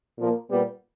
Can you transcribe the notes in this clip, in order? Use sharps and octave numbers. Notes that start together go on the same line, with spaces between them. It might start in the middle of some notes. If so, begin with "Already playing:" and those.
A#2 F3 A#3
A#2 G3 B3